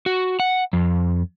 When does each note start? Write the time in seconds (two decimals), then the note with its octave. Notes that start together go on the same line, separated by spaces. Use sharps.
0.06 F#4
0.40 F#5
0.73 F2